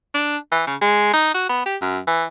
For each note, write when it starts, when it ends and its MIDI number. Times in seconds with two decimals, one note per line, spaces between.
0.14 0.37 62
0.52 0.62 52
0.67 0.76 49
0.81 1.09 56
1.14 1.33 63
1.34 1.48 66
1.49 1.63 59
1.66 1.77 67
1.82 1.99 42
2.07 2.24 52